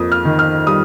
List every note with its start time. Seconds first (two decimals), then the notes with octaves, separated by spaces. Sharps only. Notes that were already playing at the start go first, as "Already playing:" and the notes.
Already playing: F2 A#3 D#6
0.12 F6
0.25 D#3
0.39 F6
0.67 G3 D#6